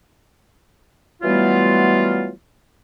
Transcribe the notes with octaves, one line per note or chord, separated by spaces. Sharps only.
E3 F#3 G3 A3 B3 F4